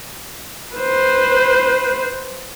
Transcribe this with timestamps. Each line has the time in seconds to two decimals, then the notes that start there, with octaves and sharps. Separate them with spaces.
0.76 B4 C5